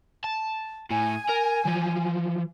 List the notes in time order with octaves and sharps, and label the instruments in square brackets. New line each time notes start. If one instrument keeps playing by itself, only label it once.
[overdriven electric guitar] A5
[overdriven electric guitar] A2 [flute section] G#5
[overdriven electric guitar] A#4
E3 F3